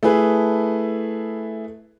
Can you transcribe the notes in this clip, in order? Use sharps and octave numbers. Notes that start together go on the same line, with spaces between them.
A3 E4 G#4 B4